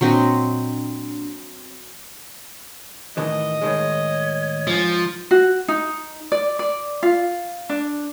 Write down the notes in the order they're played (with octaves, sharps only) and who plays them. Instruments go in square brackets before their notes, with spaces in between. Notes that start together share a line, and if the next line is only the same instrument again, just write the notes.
[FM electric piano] A#2 D4 [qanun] F#3 C4 D#5
[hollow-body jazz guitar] A2 D#3 E3 [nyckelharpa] D#5
[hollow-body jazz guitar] A2 D#3 G#3 [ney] C#5
[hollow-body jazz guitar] G#2 [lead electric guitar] F3
[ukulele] F#4
D#4
D5
D5
F4
D4